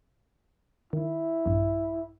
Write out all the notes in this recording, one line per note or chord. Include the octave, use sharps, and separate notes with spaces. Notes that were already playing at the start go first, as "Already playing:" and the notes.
D#3 E4
A#1 G2